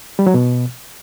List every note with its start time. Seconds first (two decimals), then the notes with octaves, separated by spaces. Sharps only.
0.19 G3
0.27 F#3
0.34 B2